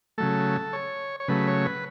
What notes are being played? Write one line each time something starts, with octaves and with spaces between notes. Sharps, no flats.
C#3 F#3 A3 A4
C#5
C#5
C#3 F#3 A3 B4
C#5
B4